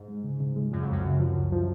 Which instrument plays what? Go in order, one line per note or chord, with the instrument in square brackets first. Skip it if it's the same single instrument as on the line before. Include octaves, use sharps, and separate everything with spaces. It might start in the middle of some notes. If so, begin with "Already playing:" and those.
Already playing: [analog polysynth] G#2
[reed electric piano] G#3
C#3
C#3
G#3
[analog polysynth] F#2 [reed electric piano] F3
[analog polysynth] F2
[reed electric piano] C#2 [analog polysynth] F#2
[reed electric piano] C#3
F3
C#2
F3